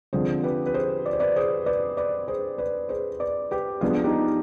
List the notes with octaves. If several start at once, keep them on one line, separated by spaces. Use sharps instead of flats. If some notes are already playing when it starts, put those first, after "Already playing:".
D3 F3 C4 G#4 C5
G4 B4
B4
G#4 C5
D5
C5
B4 D5
G#4 C5
B4 D5
B4 D5
G#4 C5
B4 D5
G#4 C5
B4 D5
G4 B4
F3 B3 D4 F4 G#4
D#4 G4